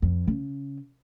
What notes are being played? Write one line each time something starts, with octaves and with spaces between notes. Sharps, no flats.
F2
C#3